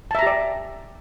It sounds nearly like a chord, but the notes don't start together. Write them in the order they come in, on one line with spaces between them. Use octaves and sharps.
A5 E5 A#5 G4 D5